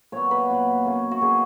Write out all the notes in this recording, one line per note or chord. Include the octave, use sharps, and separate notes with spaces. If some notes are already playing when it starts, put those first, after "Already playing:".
A#2 F#3 B3 C#5
B4
A#2 F#3 B3
B2 A#3 C#4
F#4
B2 A#3 C#4 G#4